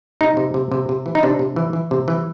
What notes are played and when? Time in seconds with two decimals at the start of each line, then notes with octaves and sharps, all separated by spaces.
0.21 C3 D#4
0.37 C3
0.54 C3
0.72 C3
0.89 C3
1.06 E3
1.15 D#4
1.23 C3 D4
1.39 C3
1.56 E3
1.73 E3
1.91 C3
2.08 E3